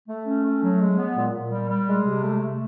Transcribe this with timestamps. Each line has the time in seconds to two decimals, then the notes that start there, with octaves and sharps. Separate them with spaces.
0.08 A3
0.26 C#4
0.44 A3
0.62 F#3
0.80 G#3
0.98 B3
1.15 A#2
1.33 A#2
1.51 G3
1.69 G3
1.87 G#3
2.05 C3
2.23 A3
2.40 A3